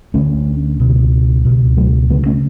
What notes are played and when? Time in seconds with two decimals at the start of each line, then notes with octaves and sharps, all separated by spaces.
0.14 D2 D3 A3 C#4
0.80 C#2 B2
1.45 C#2 B2
1.77 F#3 A3
2.10 D2 C#3 G#3 B3
2.26 A3 C#4